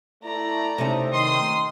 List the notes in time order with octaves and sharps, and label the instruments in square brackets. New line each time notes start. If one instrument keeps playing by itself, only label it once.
[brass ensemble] A3 E4 [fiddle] D5 A#5
[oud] C3 A3 C#4 [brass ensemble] D#4 A4 E5
[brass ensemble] D#3 [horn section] C6 [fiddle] D#6